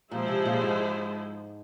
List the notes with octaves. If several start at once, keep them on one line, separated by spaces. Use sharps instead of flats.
A#2 F3 G#3 E4 G#4 C5
C3
A#2
G#2